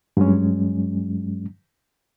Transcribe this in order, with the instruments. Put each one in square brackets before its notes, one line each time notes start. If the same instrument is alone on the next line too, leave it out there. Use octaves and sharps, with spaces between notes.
[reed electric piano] G2 F#3 G#3 C#4